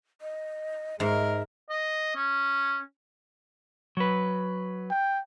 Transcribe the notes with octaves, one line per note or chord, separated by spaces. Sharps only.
D#5
G#2 G#3 A#4 E5
D#5
C#4
F#3 B4
G5